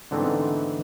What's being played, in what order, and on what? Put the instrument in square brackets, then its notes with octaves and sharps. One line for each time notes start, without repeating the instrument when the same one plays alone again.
[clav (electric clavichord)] G#2 D3 E3 A3 B3 C4